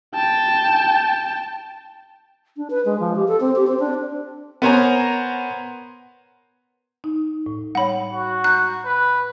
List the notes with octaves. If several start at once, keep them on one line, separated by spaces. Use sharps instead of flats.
G5 A5
D4
B4
G#3
F3
G4
A4
C4
G4
C4
D4
B3 A#4 C5 C#5 G#5 A#5
D#4
A2
G3 C#5 F#5 B5
F#4
A#5 F#6 G6
B4